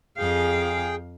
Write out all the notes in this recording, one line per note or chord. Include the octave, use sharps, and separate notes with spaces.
F2 G#4 F5 G5